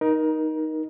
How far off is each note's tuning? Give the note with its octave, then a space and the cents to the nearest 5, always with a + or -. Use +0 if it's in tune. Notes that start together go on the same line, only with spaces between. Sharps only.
D#4 +0 A#4 +25